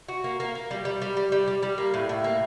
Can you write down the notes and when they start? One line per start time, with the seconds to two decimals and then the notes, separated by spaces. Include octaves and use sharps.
0.08 F#4
0.24 A#3
0.40 A#3
0.55 A#3
0.71 G3
0.85 G3
1.02 G3
1.17 G3
1.32 G3
1.48 G3
1.63 G3
1.78 A#3
1.94 A2
2.09 A2
2.24 A#3